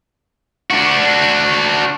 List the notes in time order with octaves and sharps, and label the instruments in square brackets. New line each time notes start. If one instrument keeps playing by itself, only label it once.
[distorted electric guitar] D4 F#4